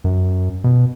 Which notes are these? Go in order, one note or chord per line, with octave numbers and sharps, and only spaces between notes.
F#2
B2